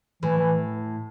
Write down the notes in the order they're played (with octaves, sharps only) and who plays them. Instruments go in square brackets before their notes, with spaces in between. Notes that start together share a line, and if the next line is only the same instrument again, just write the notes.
[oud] A2 [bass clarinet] E3
[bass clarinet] E3